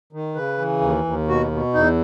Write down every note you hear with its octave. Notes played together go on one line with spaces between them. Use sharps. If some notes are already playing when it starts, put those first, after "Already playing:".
D#3
C#3 B4
E3
D#2
D#2
B2 F#4
B2
E2 D#4